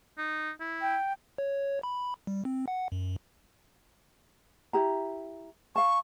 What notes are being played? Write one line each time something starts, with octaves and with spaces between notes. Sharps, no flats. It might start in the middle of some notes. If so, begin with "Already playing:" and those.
D#4
E4
G5
C#5
B5
G3
C4
F#5
F#2
E4 G4 A#5
F5 A5 C#6